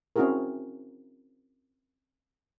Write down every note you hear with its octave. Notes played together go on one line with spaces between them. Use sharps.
C4 C#4 E4 F#4 G#4 A#4